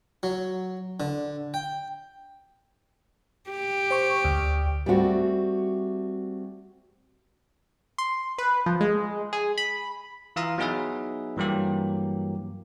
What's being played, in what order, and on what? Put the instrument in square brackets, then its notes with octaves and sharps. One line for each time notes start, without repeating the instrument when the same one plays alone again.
[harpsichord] F#3
D3
G5
[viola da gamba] G4
[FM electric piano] C5 C#6
D2
[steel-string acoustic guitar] G3 A3 C4 F4 F#4
[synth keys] C6
B4
F3
G#3
G#4
B5
[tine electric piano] E3 F4 E5 F5 A#5 D#6
F#3 B3 D#4 G#4 B4 E5
G2 E3 F#3 A#3 G4